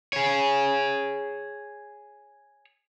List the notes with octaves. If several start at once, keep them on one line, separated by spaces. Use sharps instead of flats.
G#4 C#5